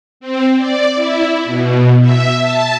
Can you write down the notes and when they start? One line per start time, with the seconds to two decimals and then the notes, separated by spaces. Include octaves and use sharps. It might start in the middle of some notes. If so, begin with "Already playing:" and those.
0.20 C4
0.57 D5
0.95 E4
1.44 B2
2.01 E5
2.40 A5